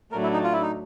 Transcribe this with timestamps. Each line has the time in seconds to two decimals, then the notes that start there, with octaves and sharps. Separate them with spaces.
0.12 A2 F#3 A3 D4 A#4
0.23 E4
0.33 D#4
0.44 F4
0.53 E4
0.62 D#4